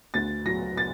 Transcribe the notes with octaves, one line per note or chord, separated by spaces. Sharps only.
D2 A6
F#3 A#6
A6